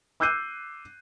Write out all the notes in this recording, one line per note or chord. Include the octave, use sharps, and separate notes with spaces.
D6 E6 F#6 G6 C7 D#7